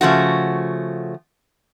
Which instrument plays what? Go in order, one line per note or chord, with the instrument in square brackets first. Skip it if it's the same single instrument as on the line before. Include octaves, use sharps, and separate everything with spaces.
[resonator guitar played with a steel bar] C#3 F3 A3 F#4